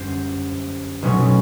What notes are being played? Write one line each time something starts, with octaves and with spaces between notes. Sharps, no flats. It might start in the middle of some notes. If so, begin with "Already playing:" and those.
Already playing: G1 F#2 C5
B1 B2 F#3 A3 C#4 C#5